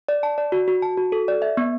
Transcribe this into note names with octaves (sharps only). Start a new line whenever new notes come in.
D5
A5
D5
F#4
F#4
A5
F#4
A4
D5
E5
B3